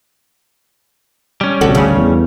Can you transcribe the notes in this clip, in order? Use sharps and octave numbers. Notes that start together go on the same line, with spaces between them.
G3 C#4
A1 D2 C3 F#4 A4
D2 C#3
E2